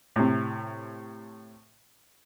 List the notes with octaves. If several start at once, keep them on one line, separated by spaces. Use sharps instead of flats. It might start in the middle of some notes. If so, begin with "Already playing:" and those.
A2 C3